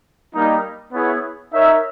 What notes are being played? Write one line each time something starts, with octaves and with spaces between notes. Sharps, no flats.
G3 A#3 D#4
B3 E4 G#4 C#5 E5
D#4 A#4 C#5 E5